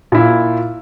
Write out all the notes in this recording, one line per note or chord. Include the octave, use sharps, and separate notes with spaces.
A#2 E4